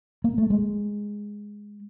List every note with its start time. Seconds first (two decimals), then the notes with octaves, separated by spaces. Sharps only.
0.24 A#3
0.38 A3
0.50 G#3